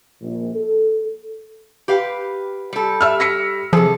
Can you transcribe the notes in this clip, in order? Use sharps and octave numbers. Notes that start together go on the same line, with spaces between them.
A#1
A4
G4 B4 F5
G3 A4
E5 E6 F6
A#6 B6 C#7
C3 F3 G#4 A4